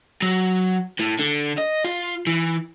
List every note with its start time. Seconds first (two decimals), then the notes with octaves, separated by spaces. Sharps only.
0.22 F#3
0.99 A2
1.19 D3
1.58 D#5
1.84 F4
2.27 E3